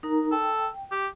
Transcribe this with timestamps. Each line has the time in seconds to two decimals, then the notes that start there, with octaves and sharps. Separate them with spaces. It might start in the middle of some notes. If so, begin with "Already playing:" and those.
0.03 D#4 A#4 A#5
0.32 A4 G5
0.92 G4